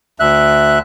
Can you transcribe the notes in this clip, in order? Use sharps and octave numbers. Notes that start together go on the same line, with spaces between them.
D2 E5 F#6